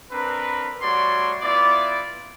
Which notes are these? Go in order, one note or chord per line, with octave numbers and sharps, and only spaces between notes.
C4 D4 A#4 B4
G3 A3 F#4 C#5 D5 C6
B3 E4 F4 D5